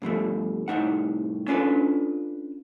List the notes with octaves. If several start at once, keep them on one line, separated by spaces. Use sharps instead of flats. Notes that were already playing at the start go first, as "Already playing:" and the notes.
G2 B2 F3 A3
C2 A2 D#4 F#5
C#4 D4 F4 A4 B4